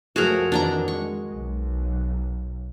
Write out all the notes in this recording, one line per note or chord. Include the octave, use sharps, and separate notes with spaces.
F#2 F3 A3 F#4 G#4 A#4
F2 D#3 E3 D4 D5 A#5
G#3 C#6
B1